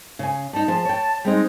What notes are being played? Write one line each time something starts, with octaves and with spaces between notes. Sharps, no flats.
C#3 G#5
G3 D#4 A5
F3 G#4 C5
C#5 G5
G3 G#3 C4 D#4